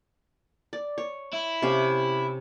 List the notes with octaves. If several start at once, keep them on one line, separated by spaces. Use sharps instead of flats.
D5
C#5
E4
C3 C#4 F5